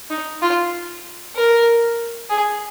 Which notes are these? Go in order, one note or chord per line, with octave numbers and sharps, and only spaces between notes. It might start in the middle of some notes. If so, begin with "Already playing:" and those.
D#4
F4
A#4
G#4